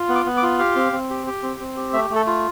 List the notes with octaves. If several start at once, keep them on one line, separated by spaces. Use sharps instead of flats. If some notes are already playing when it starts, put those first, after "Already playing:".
Already playing: F4
B3
D6
B3
D6
F4
G4 F5
C4
C4
G4
G4
C4
C4
G4
A3 E5
A3
A4
F4